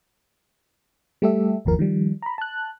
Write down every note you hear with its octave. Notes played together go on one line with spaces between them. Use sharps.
G3 A3 G4 A4 E5
G1 D#2 F3 A#4
D#3 F3 G3
A#5 B5
A5 F#6